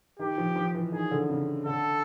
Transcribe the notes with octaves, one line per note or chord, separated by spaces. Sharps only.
D#3 G4
F3
F3
E3
D#3 G#4
D3
C#3
D3 A4